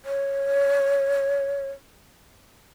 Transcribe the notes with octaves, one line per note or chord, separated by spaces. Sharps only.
C#5